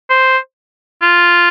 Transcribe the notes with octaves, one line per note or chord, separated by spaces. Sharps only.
C5
F4